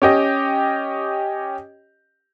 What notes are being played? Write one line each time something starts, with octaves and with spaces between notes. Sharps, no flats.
C#4 G4 D#5